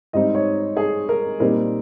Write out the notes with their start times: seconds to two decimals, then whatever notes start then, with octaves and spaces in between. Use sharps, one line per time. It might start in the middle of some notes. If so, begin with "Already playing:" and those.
0.13 G#2 G3 C4 D#4 D#5
0.35 C#5
0.77 G#4
1.09 A#4
1.40 A#2 G3 C4 D#4 A#4